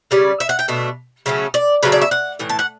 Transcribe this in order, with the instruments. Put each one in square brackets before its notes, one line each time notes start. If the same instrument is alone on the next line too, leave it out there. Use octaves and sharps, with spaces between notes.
[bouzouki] C#3 G3 C#4 D5
E5
F#5
G5
B2 A3 D4
C#3 F#3 A3 C#4
D5
C#3 F#3 A3 B4
D5
E5
F#5
A2 E3
A5
F#5